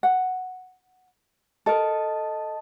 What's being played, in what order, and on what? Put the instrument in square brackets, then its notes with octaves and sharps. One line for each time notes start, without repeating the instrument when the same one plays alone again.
[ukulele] F#5
[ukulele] A4 A#4 [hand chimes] D#5 A5